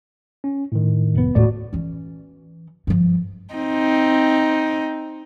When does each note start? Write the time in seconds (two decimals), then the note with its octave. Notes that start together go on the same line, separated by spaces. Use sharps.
0.44 C#4
0.72 A2 D#3
1.15 F1 B3
1.35 D#1 A2 F#4 D5
1.73 E3 C#4
2.87 G2 F3
3.54 C4 D#4